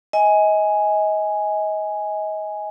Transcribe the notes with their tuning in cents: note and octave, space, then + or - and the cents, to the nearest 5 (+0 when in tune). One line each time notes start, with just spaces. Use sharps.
D#5 +30 G#5 +0